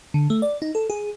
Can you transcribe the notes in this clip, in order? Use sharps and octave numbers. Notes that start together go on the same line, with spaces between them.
D3
A3
D5
D#4
A4
G#4